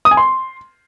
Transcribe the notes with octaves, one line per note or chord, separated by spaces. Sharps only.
D#6
G#5
C6